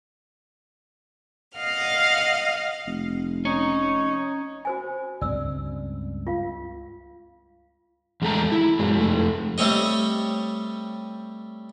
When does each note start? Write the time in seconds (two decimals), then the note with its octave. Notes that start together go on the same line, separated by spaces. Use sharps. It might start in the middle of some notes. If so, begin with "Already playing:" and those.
1.59 D#5 F5 F#5 F6
2.87 F1
3.45 C#4 D#4 C#5
4.65 F#4 C5 G#5
5.21 C#2 G2 C4 D5 E6
6.27 F4 F5
8.22 E2 G#3 A3 A4 G5 A#5
8.52 E4
8.79 F#2 F#3 G#3
8.96 F2 A3
9.58 G3 A3 C4 C#5 D#5